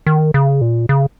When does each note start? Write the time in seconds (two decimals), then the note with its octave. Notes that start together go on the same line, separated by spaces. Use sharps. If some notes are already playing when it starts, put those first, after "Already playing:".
0.07 D#3
0.34 C#3
0.61 A#2
0.89 C#3